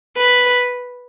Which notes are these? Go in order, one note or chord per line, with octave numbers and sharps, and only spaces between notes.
B4